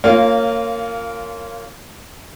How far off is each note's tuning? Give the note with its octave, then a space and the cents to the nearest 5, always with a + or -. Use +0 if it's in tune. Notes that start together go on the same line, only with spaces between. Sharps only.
A#3 -20 C#4 +0 F4 +0